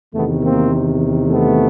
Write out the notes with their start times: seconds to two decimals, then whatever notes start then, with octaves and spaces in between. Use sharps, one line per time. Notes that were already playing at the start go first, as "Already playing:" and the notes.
0.15 E2 C3 D#3 A3 B3
0.42 A#3 C4
1.29 A3 B3